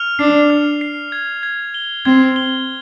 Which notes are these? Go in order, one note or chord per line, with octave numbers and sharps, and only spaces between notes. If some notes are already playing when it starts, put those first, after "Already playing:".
Already playing: F6 F7
D4 C7
F6
C7
G#6
G#6
G7
C4 G#6
G7